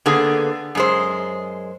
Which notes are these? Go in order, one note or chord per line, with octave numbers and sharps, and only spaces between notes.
D3 A#3 B3 G#4 A4
F#2 G#3 C5